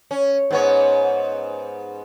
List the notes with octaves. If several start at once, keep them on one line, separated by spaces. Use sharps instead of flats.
C#4
G#2 B3 C#5